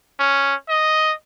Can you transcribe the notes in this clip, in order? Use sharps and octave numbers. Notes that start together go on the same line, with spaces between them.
C#4
D#5